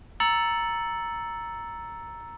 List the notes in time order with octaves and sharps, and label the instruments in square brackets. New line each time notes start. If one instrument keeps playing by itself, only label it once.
[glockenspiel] A#5 E6 A6 C#7 F#7